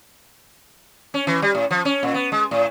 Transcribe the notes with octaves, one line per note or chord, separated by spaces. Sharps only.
C#4
E3
G3
A2
F3
C#4
A#2
B3
G#3
A2